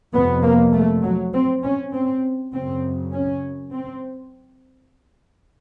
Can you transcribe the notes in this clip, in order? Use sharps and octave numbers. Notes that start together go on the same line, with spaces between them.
F2 C3 B3
A#3
A3
F#3
C4
C#4
C4
F#2 C#3 C4
C#4
C4